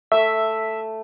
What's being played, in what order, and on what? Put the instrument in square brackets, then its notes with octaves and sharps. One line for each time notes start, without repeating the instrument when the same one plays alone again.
[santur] A3 [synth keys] E5